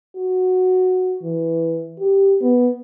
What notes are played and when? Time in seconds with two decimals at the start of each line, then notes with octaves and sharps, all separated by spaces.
0.16 F#4
1.22 E3
2.00 G4
2.41 B3